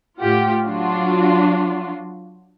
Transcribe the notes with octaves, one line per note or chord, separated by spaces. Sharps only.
A2 F4 G4 F#5
F#3 D4 F4 F#4